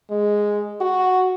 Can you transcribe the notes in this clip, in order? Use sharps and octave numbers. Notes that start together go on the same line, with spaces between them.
G#3
F#4